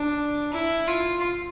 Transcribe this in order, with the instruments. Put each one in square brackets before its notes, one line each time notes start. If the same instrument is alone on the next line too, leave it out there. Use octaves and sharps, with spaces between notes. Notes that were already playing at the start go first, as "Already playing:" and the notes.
Already playing: [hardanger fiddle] D4
E4
F4